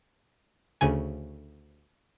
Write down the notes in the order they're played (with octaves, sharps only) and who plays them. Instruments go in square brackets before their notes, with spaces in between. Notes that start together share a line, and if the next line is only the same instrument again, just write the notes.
[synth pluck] D2 C#3 G#5